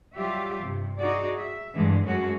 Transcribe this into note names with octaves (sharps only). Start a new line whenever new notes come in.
F#3 G3 F4 G4 E5
G2 C3
D#4 F#4 G#4 D5
E5
G2 D3 E3 G#3
F#2 G#3 A3 C#4 F#4